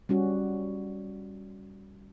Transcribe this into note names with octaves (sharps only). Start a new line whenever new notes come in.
G3 C#4 F#4